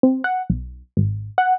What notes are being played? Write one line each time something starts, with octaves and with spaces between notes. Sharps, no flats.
C4
F#5
B1
G#1
F#5